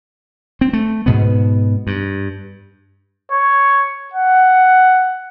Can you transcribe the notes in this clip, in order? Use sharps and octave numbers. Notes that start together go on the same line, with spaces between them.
C4
A3
G#2 B2 B3
G2
C#5
F#5